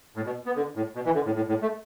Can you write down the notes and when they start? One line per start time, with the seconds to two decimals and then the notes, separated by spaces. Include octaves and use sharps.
0.16 A2
0.26 B2
0.46 B3
0.56 D3
0.75 A2
0.95 B2
1.05 E3
1.15 D3
1.26 A2
1.36 A2
1.48 A2
1.62 A3